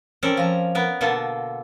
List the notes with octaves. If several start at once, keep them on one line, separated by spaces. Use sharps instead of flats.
C4 C#4 A4 A#4 D5
F3 A#5
B3 A#4
B2 D3 A#3 A4 A5